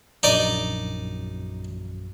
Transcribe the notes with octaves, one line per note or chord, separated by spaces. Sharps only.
A#1 F#2 D#4 D5